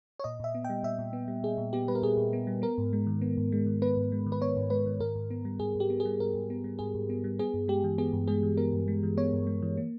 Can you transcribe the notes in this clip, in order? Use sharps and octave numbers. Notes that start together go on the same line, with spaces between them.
C#5
A#2 D#5
A#2 E5
B3
G3 G5
A#2 E5
A#2
B3
G3
A#2 G#4
A#2
B3 G4
G3 B4
A#4
A#2 G#4
A#2
B3
G3
B3 A#4
G#2
G#3
D#3
B3
G#2
G#3
D#3
B3 B4
G#2
G#3
D#3
B4
B3 C#5
G#2
G#3 B4
D#3
G#2 A#4
G#2
B3
G3
G#2 G#4
G#2 G4
B3
G#4
G3
G#2 A#4
G#2
B3
G3
G#2 G#4
G#2
B3
G3
B3 G#4
G2
G#3 G4
E3
B3 G#4
G2
G#3 G#4
E3
B3 A#4
G2
G#3
E3
B3 C#5
G2
G#3
E3
A#3